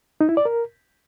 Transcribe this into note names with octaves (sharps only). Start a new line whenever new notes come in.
D#4
E4
D5
A#4